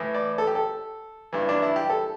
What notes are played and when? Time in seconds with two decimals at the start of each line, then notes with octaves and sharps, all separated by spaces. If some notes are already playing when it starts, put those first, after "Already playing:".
Already playing: A2 E3
0.14 D5
0.38 A4
0.47 G4
0.55 A4
1.33 G2 E3
1.49 D4
1.62 E4
1.76 G4
1.90 A4